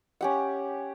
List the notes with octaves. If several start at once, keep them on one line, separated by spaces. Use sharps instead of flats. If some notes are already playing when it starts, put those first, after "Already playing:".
C#4 G4 F#5